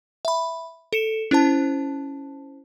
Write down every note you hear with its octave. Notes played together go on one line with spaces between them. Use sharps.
E5 B5
A4 C#7 E7
C#4 E4 C5 A5